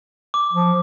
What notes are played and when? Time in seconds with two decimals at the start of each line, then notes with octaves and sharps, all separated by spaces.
0.34 D6
0.53 F3